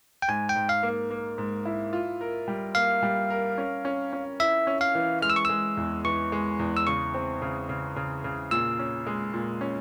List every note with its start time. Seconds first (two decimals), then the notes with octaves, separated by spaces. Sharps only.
0.22 G5
0.28 G#2 G#5
0.49 G5
0.55 G#2
0.69 F5
0.83 A#3
1.11 A#3
1.38 G#2
1.65 E4
1.93 F4
2.21 A#4
2.48 G3
2.75 A#3 F5
3.03 G3
3.30 A#4
3.58 C#4
3.85 C#4
4.13 C#4
4.40 E4 E5
4.67 C#4
4.81 F5
4.95 E3
5.22 G#3 F6
5.30 E6
5.36 C#6
5.45 G#3 E6
5.77 E2
6.04 E3 C#6
6.32 G#3
6.59 E2
6.77 E6
6.87 C#3 C#6
7.14 C4
7.42 C#3
7.69 C#3
7.96 C#3
8.24 C#3
8.51 A#2 E6
8.79 C#4
9.06 G#3
9.33 A#2
9.61 C#4